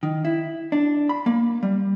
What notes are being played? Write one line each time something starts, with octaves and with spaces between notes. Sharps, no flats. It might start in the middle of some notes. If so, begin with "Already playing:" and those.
D#3
E4
D4
B5
A#3
G3